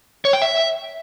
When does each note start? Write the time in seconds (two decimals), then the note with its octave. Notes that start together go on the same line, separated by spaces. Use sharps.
0.25 C#5
0.33 G5
0.42 E5